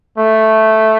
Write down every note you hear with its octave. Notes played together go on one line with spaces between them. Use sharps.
A3